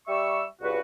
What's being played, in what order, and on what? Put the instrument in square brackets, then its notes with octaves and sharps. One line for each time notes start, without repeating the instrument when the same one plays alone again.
[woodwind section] G3 E5 C#6 E6
C#2 G2 F#4 B4